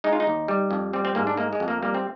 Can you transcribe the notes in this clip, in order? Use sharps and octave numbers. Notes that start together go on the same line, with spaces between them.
G#3 D#4
F4
D#4
D#2
G3
F2
G3 C4
C4
G#2 A#3
D4
G#3 A#3
G#3
F2
A#3
G3 A#3
C4